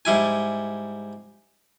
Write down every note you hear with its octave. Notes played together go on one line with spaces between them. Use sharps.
G#2 G3 E4 G#5